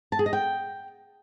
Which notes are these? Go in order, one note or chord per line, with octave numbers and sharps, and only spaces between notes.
A5
G#4
D#5
G5